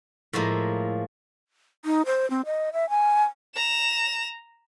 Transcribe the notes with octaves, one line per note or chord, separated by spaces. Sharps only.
A2 F3 G#3 A#3 E4
D#4
C5
C4
D#5
E5
G#5
A#5 E7